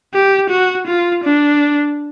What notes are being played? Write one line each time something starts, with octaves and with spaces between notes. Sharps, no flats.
G4
F#4
F4
D4